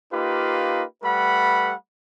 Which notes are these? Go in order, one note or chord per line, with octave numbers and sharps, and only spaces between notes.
A#3 D#4 F4 G4 B4
G3 A3 B4 F#5 B5